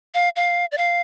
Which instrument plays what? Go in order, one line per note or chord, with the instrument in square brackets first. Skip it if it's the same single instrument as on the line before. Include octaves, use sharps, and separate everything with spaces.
[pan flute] F5
F5
D5
F5